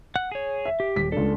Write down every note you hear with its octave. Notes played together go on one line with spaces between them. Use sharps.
F#5 F#6
G#4 C#5
E5
G4
D#1 B6
C#2 D4 A4